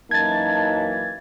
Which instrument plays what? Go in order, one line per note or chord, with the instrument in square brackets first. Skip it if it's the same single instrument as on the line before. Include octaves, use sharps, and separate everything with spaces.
[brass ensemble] F#2 E3 A#3 [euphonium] D#4 [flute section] A5 [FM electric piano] G#6 A6